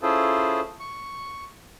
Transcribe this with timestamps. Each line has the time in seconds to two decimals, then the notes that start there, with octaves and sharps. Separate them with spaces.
0.02 C#4 E4 F4 G#4 A4 C5
0.80 C#6